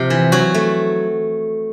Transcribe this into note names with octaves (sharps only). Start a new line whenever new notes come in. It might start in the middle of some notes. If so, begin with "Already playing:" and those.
Already playing: C3 F3
E3
F#3 F#4
A3